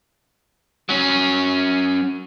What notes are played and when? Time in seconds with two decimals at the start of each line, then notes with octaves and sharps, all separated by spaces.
0.89 F#3 C#4